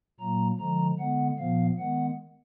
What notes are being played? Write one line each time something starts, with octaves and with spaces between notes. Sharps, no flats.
A#2 F#3 A#3 A#5
D3 F3 G#3 A#5
D3 G#3 B3 F#5
A#2 F3 B3 F5
D#3 G#3 B3 F#5